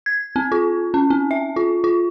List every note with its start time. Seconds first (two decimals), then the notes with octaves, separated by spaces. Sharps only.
0.06 G#6
0.36 C4
0.52 F4
0.94 C#4
1.10 C4
1.31 E5
1.56 F4
1.84 F4